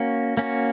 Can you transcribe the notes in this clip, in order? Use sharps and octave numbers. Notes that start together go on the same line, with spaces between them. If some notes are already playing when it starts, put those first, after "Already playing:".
Already playing: A#3 C#4 F#4
A#3 C#4 F#4